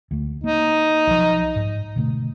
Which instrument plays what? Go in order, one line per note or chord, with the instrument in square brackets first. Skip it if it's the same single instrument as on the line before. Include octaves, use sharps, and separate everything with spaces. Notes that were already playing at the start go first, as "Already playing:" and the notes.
[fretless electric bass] D2 A3
[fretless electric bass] A#3 [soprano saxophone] D#4
[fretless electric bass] B1 F3
G#2
B2 D3 A3